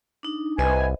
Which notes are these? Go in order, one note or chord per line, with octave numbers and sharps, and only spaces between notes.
D4 D#4
C2 B4 C5 D#5 E5 G#5